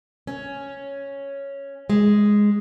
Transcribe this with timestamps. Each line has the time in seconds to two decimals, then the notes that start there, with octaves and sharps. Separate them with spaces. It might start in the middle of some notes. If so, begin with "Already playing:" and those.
0.27 C#4
1.90 G#3